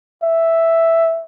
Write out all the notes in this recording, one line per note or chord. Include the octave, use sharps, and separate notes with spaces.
E5